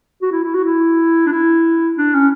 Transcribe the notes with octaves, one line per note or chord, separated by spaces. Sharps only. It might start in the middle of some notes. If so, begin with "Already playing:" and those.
F#4
E4
E4
F#4
E4
D4
E4
D4
C#4